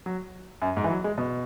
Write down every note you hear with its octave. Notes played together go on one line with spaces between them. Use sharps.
F#3
F#2
G#2
E3
F#3
G#3
B2